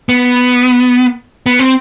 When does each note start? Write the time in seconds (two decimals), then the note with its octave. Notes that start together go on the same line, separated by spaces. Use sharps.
0.09 B3
1.46 B3
1.59 C4